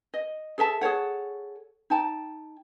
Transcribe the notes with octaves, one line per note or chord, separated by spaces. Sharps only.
D#5
G#4 A4 E5 A5
G#4 A4 C#5 F#5
D#4 G5 A5